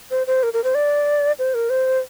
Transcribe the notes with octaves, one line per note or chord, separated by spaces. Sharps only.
C5
C5
A#4
A#4
C5
D5
C5
A#4
C5